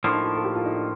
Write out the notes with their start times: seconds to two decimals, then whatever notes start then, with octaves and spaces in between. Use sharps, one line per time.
0.04 A2 F3 A#3 D4
0.14 D#4
0.24 F4
0.35 A4
0.45 G4
0.55 F4
0.66 D#4
0.76 D4